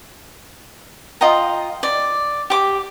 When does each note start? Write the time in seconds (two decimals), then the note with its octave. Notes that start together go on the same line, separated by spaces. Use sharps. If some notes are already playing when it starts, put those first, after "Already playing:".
1.21 F4 D#5 G5 A#5
1.83 D5
2.50 G4 D6